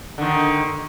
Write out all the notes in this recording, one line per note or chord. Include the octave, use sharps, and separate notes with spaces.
D3 D#3